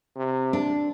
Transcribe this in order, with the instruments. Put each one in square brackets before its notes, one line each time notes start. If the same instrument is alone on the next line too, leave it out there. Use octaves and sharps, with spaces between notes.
[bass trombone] C3
[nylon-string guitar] D4